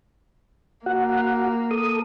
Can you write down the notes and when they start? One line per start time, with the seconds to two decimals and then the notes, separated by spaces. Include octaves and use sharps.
0.86 A#3 F#4 F#5
1.71 A4 D#6